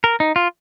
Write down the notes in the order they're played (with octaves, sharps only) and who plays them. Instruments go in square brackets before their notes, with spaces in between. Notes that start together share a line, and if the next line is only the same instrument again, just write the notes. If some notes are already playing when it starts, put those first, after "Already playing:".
[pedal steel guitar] A#4
D#4
F4